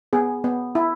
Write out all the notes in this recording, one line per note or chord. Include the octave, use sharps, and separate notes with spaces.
B3 G#4
B3
E4